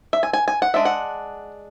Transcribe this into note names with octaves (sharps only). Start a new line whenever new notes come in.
E5
G#5
G#5
G#5
F#5
G#3 D4 E5
F#5